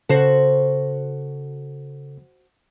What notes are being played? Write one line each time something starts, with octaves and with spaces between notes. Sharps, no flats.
C#3 F#4 A4 C5